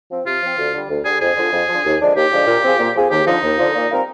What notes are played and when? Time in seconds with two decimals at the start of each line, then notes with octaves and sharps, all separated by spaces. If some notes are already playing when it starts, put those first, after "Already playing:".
0.11 F3 C4
0.26 C3 F4
0.42 F3 C4
0.58 D2
0.73 D3 G3
0.90 D2
1.05 D3 G3 G#4
1.21 F2 G#4
1.37 D3 F3
1.53 F2
1.68 D3 F3
1.84 D#2
2.00 D3 F3 G#3 D4
2.16 D#2 G4
2.32 D3 F3 G#3 D4
2.47 A#2
2.63 F3 C4 F4 G#4
2.79 A#2
2.95 F3 C4 F4 G#4
3.10 D#2 G4
3.27 D3 F3 D#4
3.42 D#2
3.58 D3 F3
3.74 A#2
3.90 G3 C4 F4 A#4